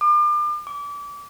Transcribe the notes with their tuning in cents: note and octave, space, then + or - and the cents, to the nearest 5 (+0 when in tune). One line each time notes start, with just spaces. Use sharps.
D6 +35
D6 -30